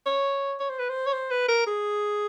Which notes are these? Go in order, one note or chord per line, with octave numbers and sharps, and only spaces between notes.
C#5
C#5
C5
B4
C5
C#5
C5
B4
A#4
G#4